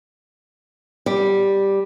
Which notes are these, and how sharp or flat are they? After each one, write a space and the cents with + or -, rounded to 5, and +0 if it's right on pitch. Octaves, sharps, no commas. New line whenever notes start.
G3 +0